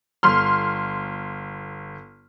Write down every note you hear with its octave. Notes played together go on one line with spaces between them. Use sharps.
G1 C6 F6